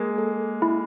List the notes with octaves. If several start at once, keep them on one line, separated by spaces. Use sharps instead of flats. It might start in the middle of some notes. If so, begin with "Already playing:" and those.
Already playing: G#3 A#3
A4
E4